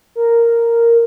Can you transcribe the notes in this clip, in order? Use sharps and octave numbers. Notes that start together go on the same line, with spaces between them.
A#4